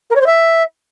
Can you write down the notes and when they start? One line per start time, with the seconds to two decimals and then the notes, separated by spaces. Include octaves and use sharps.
0.10 A#4
0.15 C#5
0.21 C5
0.26 E5